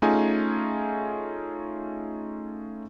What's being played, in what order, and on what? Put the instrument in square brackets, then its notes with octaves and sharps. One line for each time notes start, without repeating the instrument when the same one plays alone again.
[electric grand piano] A3 C#4 D#4 F4 G#4 G#5